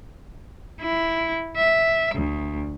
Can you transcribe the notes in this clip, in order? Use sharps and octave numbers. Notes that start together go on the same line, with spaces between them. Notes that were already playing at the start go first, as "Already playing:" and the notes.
E4
E5
D2